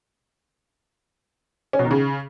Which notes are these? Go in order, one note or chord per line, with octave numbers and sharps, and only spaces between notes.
C#4
B2
D#3
C#3